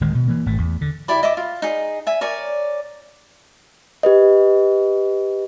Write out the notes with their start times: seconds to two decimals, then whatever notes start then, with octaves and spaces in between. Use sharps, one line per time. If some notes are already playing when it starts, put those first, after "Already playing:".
0.01 D1 D#3 G#3
0.15 B2
0.28 E3 A#3
0.46 G#1 A3
0.58 E2
0.81 D3
1.08 E4 G4 D5 B5
1.23 D#5 E5 D6
1.37 F4
1.62 D#4 G#4
2.07 E5 G#5
2.21 A#4 C#5 D5 G#5
4.03 G4 B4 D#5